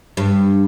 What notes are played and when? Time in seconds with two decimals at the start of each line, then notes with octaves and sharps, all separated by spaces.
0.17 G2